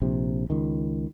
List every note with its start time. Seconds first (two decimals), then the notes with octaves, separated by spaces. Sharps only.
0.02 A#1 C3
0.50 C#2 D#3